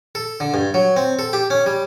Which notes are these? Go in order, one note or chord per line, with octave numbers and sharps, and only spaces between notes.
A4
D3
G2
F#3
C4
A4
G4
C#4
G3